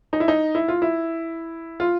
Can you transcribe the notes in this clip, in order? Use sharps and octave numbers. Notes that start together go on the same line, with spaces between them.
D#4
E4
D#4
E4
F4
E4
F4